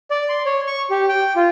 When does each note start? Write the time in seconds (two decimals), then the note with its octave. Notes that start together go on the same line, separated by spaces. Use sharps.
0.11 D5
0.29 C6
0.46 C#5
0.67 C#6
0.90 G4
1.09 G5
1.36 F4